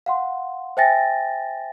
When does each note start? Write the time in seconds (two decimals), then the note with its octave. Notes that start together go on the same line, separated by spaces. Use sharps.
0.06 F5 F#5 C6
0.77 C5 E5 G5 G#5 A6 A#6